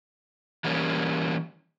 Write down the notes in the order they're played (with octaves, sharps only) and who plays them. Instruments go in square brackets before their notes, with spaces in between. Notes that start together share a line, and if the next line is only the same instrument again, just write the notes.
[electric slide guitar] E3 G3 A#3 C#4